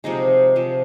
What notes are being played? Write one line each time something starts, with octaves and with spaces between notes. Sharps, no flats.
C3 F3 G#3 D#4
C3 F3 G#3